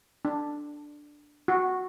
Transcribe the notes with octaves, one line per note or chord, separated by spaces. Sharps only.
D4
F#4